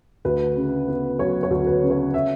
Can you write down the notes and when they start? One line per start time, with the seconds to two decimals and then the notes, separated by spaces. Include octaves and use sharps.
0.25 D2 B4
0.56 C#3
0.88 B3
1.19 F#3 C#5
1.43 C#5
1.51 D2
1.67 B4
1.83 C#3
1.90 C#5
2.14 E5